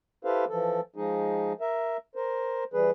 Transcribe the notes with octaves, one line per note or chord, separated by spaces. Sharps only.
E4 G4 A4 B4 C5 F5
E3 F3 A4
F3 G#3 D#4 G#4
A#4 E5
A#4 C5
E3 G3 G#4 B4